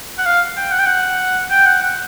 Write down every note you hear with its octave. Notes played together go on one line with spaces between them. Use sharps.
F#5
F5
G5
F#5
G5
F#5
G5
F#5
F#5